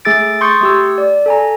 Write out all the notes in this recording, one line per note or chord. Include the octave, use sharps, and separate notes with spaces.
A3 G#4 E6 A6 D7
C6 C#6 D#6 G6 A6 C#7
A3 G4 E6
D5
A4 G#5 A#5